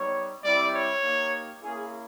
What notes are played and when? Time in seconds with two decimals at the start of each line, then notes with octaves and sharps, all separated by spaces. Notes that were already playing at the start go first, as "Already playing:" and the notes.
Already playing: G3 B3 D#4 C#5
0.43 G3 C4 E4 G4 D5
0.73 C#5
1.03 A#3 D#4 G4
1.62 A#3 C#4 E4 G#4